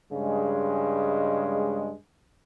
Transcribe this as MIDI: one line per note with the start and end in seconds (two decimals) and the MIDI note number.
0.12 1.93 43
0.12 1.93 49
0.12 1.93 56